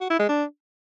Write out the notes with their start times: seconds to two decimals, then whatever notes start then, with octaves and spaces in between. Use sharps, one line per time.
0.01 F#4
0.10 E4
0.20 G#3
0.29 D4